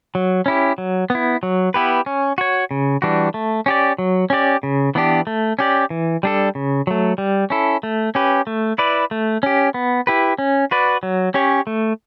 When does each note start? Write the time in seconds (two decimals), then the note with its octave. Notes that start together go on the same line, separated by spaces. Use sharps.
0.15 F#3
0.46 C#4 E4 G4
0.78 F#3
1.10 B3 E4
1.43 F#3
1.74 B3 E4 G4 B4
2.06 C#4
2.38 F#4 C#5
2.71 C#3
3.02 E3 G3 D4 F#4
3.34 A3
3.66 C#4 G4 D5
3.98 F#3
4.30 C#4 G4 D5
4.63 C#3
4.95 E3 B3 D4 G4
5.27 A3
5.59 C#4 G4 D5
5.90 E3
6.23 G3 D4 A4
6.55 C#3
6.87 F#3 A3
7.18 G3
7.50 C#4 E4 A4
7.83 A3
8.15 C#4 G4 B4
8.47 A3
8.78 E4 B4 D5
9.11 A3
9.43 C#4 G4
9.74 B3
10.07 E4 G4 B4
10.38 C#4
10.71 F#4 B4 D5
11.03 F#3
11.34 C#4 G4 C#5
11.67 A3